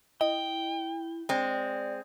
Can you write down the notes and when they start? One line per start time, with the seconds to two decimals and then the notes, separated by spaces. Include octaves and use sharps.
0.21 E4 D#5 G5
1.29 G#3 C4 D5